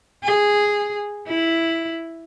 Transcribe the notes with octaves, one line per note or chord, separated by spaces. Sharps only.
G#4
E4